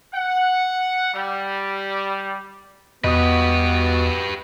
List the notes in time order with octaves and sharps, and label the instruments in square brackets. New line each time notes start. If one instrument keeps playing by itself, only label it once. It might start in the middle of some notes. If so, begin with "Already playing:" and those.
[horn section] F#5
G3
[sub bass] E2 [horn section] B3 F#4 [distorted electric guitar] G4 B4 [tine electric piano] D#5 D#6